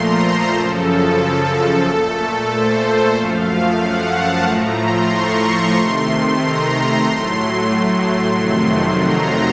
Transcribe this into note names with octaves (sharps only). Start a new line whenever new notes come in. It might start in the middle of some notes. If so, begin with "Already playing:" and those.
Already playing: A#2 F3 A3 A#5 C6
C5
F#2 C#3 F3 A4
A#2 A3 A4
C5
F#2 F3 A3 F5
F#5
A5
A2 F3 A3 A#5
C6
C#6
C6
C3 D#3 A3
A#5
A2 F#3 A3 C6
C6
F2 C3 D#3 F#3 A3
A#5